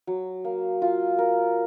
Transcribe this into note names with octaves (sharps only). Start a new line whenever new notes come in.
F#3
A#3
F4
A#4